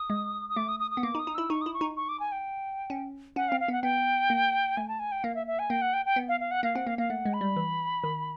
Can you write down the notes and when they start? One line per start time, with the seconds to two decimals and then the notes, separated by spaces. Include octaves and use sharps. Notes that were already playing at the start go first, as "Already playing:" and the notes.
Already playing: D#6
0.10 G#3
0.50 D#6
0.56 A3 D6
0.68 D#6
0.80 D#6
0.91 D#6
0.97 B3
1.03 A#3 D6
1.15 D#4
1.19 D#6
1.27 D#4
1.35 E4 E6
1.50 D#4 C#6
1.62 E4 D#6
1.74 C#6
1.81 D#4
1.97 C#6
2.09 D6
2.20 G#5
2.32 G5
2.90 C#4
3.36 C#4 F#5
3.49 F5
3.52 C4
3.60 F5
3.68 B3 F#5
3.83 B3 G5
4.30 A#3
4.77 A3 G#5
4.88 A5
5.00 G#5
5.12 G5
5.24 A#3 F5
5.35 E5
5.47 E5
5.59 G#5
5.70 A#3 G5
5.82 F#5
5.94 G5
6.06 G5
6.16 B3
6.29 F5
6.40 F5
6.51 F#5
6.63 A#3 F5
6.75 C4 F#5
6.87 A#3 F5
6.98 A#3 F5
7.10 A3 F#5
7.26 G#3
7.34 B5
7.41 G3
7.57 E3
8.04 D#3